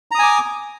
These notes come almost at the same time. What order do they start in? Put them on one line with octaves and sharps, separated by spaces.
A#5 D#6 G#5 D6